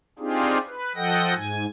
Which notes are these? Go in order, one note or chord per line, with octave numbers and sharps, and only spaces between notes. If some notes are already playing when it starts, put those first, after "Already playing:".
C4 D4 D#4 F4 G4 G#4
B4
F3 A4 D#5 F#5 G5 A#6
G#2 G#5